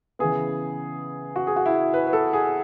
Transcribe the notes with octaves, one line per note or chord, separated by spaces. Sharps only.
C#3 E3 B3 G#4
F#4
G#4
F#4
E4
B4
B4
A4
G#4